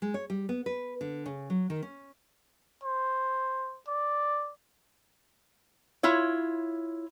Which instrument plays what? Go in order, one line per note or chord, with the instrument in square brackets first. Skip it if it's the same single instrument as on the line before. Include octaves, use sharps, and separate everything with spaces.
[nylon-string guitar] G#3
C#5
G3
B3
B4
D3
C#3
F#3
D#3
C#4
[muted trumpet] C5
D5
[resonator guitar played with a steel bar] E4 F4 C#5